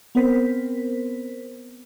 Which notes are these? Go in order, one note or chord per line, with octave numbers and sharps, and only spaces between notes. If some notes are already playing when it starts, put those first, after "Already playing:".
B3 C4 A#4 C5 B6